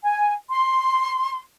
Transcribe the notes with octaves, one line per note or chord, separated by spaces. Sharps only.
G#5
C6